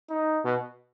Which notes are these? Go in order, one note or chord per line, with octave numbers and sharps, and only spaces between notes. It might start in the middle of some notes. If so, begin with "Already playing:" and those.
D#4
B2